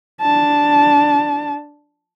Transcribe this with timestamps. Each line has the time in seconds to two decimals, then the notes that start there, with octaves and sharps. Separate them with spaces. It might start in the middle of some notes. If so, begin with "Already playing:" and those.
0.21 D4 A5